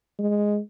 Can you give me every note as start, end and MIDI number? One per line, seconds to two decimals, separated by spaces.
0.19 0.59 56